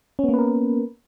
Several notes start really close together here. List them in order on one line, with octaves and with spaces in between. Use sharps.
C#4 B3 A#3 B4 A#4